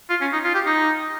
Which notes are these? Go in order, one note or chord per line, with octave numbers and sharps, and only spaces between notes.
F4
C#4
D#4
F4
G4
D#4